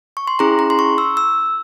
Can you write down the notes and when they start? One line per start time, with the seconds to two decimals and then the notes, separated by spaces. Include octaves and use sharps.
0.17 C#6
0.27 C6
0.39 C#4 E4 G#4 A#5
0.59 A#5
0.70 C6
0.79 C#6
0.98 E6
1.17 E6